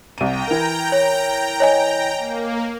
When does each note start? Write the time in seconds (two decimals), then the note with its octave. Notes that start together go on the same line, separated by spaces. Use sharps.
0.18 C2 G5 A#5 D#7
0.47 E3 A#4
0.92 C#5
1.60 C#5 D#5 G#5
2.18 A#3